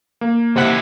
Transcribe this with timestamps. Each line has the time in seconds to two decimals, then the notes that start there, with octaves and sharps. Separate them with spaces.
0.21 A#3
0.56 B1 C3 E4 F#5 B6